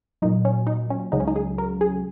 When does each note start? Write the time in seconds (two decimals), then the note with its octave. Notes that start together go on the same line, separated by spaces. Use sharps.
0.22 A#2 F#3 D#4
0.45 C#4
0.67 D#4
0.90 C#4
1.12 C#2 C#3 F#3 D#4
1.20 C#4
1.28 D#4
1.36 G#4
1.58 A#4
1.81 G#4